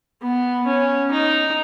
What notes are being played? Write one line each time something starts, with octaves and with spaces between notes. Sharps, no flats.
B3
C#4
D#4